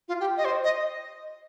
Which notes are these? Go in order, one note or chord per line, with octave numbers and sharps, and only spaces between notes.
F4
G4
D#5
C5
D#5